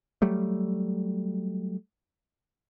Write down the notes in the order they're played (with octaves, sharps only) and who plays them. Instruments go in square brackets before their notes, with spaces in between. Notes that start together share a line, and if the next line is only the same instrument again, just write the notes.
[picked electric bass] F#3 G3 A3